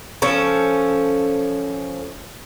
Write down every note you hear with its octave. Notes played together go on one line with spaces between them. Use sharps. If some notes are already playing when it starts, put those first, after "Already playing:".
F3 C#4 A4